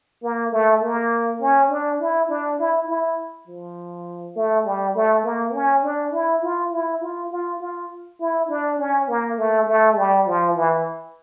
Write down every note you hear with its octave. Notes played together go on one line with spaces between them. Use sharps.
A#3
A3
A#3
C#4
D4
E4
D4
E4
E4
F3
A3
G3
A3
A#3
C#4
D4
E4
F4
E4
F4
F4
F4
E4
D4
C#4
A#3
A3
A3
G3
F3
E3